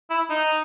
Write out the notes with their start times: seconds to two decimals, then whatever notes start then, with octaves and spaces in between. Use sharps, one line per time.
0.10 E4
0.30 D#4